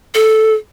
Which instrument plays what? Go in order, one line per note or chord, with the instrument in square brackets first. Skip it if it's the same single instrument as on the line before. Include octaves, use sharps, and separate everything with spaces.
[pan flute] A4